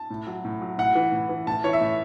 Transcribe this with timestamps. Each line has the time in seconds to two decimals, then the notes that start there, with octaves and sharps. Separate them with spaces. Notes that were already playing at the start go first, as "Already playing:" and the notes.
Already playing: A5
0.10 A2
0.27 F#3
0.45 A2
0.61 F#3
0.78 A2 F#5
0.95 E3
1.12 A2
1.29 E3
1.47 A2 A5
1.64 E3 C#5
1.73 E5
1.81 A2